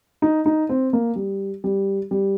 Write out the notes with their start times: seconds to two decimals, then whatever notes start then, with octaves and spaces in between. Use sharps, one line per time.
0.22 D#4
0.46 D#4
0.69 C4
0.93 A#3
1.16 G3
1.64 G3
2.11 G3